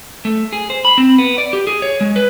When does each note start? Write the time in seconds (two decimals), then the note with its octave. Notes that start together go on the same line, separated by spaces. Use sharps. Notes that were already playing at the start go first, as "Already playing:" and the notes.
0.25 A3
0.53 G#4
0.70 C5
0.85 B5
0.98 C4
1.18 B3
1.38 D5
1.53 G4
1.67 G#4
1.82 C#5
2.01 G#3
2.16 B4